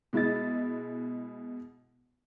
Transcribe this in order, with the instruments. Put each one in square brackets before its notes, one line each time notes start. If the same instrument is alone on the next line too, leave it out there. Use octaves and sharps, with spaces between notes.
[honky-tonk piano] B2 G#3 E4 D#5 A6